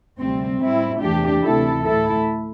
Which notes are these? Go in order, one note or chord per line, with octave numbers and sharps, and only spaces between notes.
D2 C3 G3 C4
A2 G3 C4 E4
E2 C3 E3 A3 D4 G4
D2 C3 E3 A3 E4 A4
A2 A3 E4 A4